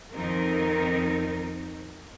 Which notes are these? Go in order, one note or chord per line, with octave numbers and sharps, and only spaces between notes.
F2 D#3 C4 D#4 A#4